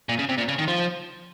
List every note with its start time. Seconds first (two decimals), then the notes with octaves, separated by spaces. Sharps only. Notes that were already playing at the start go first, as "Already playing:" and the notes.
0.09 A#2
0.19 C#3
0.29 C3
0.38 A#2
0.48 C#3
0.58 D#3
0.68 F3